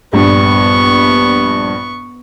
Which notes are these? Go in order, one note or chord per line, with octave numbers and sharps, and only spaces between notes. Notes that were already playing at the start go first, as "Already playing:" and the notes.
A#1 G2 B3 C#6